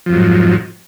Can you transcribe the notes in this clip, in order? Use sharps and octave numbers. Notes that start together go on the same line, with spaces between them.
F2 G#2 F3 F#3